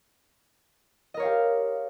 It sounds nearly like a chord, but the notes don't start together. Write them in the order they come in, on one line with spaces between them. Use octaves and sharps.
D#5 A#4 C#5 F5 G4